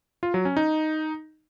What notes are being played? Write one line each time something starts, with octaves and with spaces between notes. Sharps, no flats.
F4
F#3
C#4
D#4